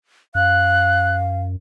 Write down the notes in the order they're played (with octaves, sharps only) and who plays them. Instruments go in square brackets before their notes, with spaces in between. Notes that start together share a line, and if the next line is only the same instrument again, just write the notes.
[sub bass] F#2 [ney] F5 [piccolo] F#6